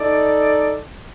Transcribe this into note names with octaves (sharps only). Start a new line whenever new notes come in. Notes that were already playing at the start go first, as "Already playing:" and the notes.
Already playing: D#4 A4 D5